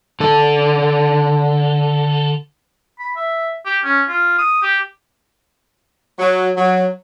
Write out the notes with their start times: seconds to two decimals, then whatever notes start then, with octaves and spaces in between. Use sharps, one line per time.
0.20 D3 A4
2.99 B5
3.17 E5
3.66 G4
3.84 C#4
4.09 F4
4.38 D#6
4.62 G4
6.18 F#3
6.56 F#3